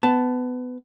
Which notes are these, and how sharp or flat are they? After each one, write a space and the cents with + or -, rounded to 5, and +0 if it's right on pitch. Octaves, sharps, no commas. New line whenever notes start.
B3 +20 A5 +0